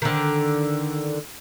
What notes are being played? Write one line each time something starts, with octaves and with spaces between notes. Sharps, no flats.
D3 D#3